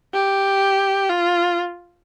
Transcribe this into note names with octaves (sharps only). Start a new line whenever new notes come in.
G4
F4